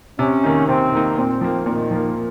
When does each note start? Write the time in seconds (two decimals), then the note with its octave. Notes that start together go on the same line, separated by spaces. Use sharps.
0.19 C3 C#4
0.44 D#3 A#3 D#4
0.68 C3 C4
0.92 D#3 A#3 D#4
1.17 A#2 C4
1.41 F3 A#3
1.66 A#2 D#3
1.91 F3 A#3